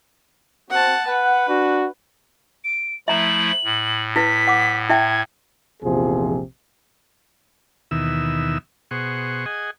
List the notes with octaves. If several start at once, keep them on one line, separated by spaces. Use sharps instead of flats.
C4 F#4 F#5 A5
B4 F#5
D4 F#4
D7
F3 A3 E4 E5 A#5 F#7
A2
E4 B4 B6
F#5 D6
E4 E5 G5 G#6
A#1 E2 C3 F3 G#4
D#2 B2 D#3 E3 E5 E6
B2 G#4 C5 F#5 C#6
G#4 D#5 F#5 G#5